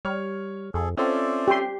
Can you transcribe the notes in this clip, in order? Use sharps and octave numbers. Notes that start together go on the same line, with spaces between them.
G3 C#5 F6
F2 G#4 A4
C4 C#4 F4 A4 C5 D5 E5
G4 C6